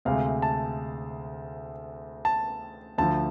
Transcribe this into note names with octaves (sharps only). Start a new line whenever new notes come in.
D2 C3 G#3 F5
A5
A5
D2 D3 F3 A5